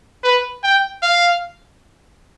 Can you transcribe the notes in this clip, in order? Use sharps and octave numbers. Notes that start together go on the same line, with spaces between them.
B4
G5
F5